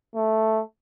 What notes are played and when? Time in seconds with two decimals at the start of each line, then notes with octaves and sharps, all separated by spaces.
0.15 A3